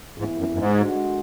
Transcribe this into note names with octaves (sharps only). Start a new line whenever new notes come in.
G#2 E3 B3 E4
F#2
F#2
G#2
D3 G#3 D4 F#4